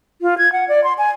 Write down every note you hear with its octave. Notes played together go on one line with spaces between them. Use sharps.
F4
G#6
F#5
D5
C6
G#5